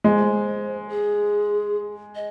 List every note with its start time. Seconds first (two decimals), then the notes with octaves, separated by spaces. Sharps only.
0.04 G#3 C5
0.89 G#4
2.15 D#5